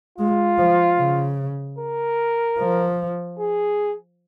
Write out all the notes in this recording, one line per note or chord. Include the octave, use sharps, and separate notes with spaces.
G#3 F4
F3
C#3
A#4
F3
G#4